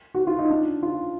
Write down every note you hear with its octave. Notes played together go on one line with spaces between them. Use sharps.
F#4
F4
D#4
D4
F4